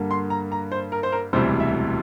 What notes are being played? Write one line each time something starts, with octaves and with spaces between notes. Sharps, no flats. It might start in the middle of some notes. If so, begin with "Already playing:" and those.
Already playing: G2 D3 G3 A#3
C6
A#5
A#5
C5
A#4
C5
A#4
E1 D2 C3 E3 G3 C5
E5